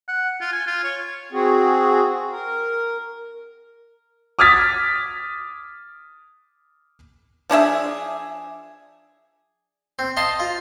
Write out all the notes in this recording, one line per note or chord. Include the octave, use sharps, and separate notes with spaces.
F#5
F4
G#5
F4
C#5
C4 F#4 G#4
A#4
D6 D#6 F6 G#6 A6 B6
F3 D4 G#4 E5
C4
D#5 F5 A5 C6
F4